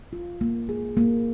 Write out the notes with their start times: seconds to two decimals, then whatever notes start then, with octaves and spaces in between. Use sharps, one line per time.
0.13 F4
0.41 A#3
0.69 G#4
0.97 A#3